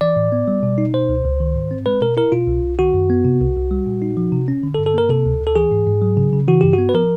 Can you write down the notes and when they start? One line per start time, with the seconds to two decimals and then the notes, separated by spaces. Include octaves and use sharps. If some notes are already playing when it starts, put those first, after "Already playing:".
0.01 E3 D5
0.16 A2
0.32 B3
0.48 G3
0.63 B2
0.78 D#4
0.94 B2 C5
1.09 C#2
1.24 C#2
1.40 D#3
1.55 G#2
1.71 C4
1.86 G#3 B4
2.02 B2 A#4
2.17 E4 A#4
2.32 B2 F4
2.47 C2
2.63 C2
2.79 D#3 F#4
2.94 F#2
3.10 B3
3.25 C3
3.40 C2
3.56 C2
3.71 G3
3.86 A#2
4.02 D#4
4.17 F3
4.33 C3
4.48 C#4
4.63 D3
4.74 A4
4.79 G2
4.86 A4
4.94 A#3 A#4
5.09 C3 A4
5.26 D2
5.41 D2
5.47 A4
5.56 E3 G#4
5.71 G#2
5.87 G#2
6.02 F#3
6.17 C#3
6.33 C#3
6.48 E3 F#4
6.61 G2 G4
6.73 B3 F#4
6.89 B4
6.94 F3 A#4